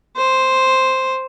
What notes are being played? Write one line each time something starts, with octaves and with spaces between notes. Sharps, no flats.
C5